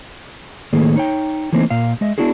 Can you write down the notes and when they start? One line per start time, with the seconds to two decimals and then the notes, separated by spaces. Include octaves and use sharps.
0.73 A2 D#3 A#3 G#4 A4
0.96 D#4 C#5 G5
1.53 E3 A3 A#3 C4 D#4
1.70 A#2 F5
2.01 G#3 D#5 E5
2.18 B3 D4 E4 F#4 G#4